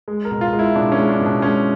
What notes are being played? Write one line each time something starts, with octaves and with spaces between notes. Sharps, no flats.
G#3
A#4
B2
F4
G#3
E4
B2 D4
C#4
G#3
D4
B2
D4
G#3 C#4